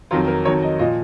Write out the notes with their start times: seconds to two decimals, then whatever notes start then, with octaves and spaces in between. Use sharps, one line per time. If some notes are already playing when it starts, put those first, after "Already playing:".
0.11 F2 D#3 F#3 F4
0.28 A#4
0.45 F2 D#3 F#3 C#5
0.62 D#5
0.79 A#2 F3 D#5